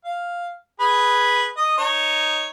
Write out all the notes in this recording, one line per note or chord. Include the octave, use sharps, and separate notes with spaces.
F5
G#4 B4
D#5
D#4 C#5